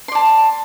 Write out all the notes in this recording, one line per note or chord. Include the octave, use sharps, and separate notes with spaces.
D5 A5 C6